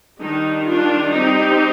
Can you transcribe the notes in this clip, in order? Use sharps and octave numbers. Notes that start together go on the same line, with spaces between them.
D#3 G3 D4 D#4
D4 F4
G3 C4 D#4 G4